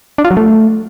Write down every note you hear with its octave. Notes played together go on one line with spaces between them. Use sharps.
D4
F4
F#3
A3